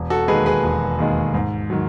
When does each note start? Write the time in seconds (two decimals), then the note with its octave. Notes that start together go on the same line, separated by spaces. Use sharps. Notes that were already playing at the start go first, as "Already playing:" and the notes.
Already playing: E1
0.10 F#4 A4
0.28 D#2 D#3 G#3 G#4 B4
0.46 G#4 B4
0.63 E1
0.99 D#2 D#3 G#3
1.34 G#2
1.70 D#3 F#3